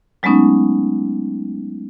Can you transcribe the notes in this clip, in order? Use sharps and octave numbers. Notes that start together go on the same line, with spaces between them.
F#3 G#3 A3 B3 C#4 D#4